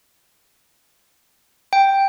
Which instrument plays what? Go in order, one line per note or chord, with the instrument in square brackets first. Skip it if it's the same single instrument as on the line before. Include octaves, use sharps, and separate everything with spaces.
[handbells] G5